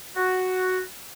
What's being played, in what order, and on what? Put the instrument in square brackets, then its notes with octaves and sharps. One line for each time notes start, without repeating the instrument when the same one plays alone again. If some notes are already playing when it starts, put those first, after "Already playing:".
[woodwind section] F#4